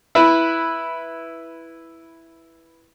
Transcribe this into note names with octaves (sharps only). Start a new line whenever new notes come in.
E4 B4